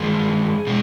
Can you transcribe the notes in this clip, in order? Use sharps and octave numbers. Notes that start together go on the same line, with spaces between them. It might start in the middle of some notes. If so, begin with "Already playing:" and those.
Already playing: G2 D#3 G#3 G#4
B2 G#3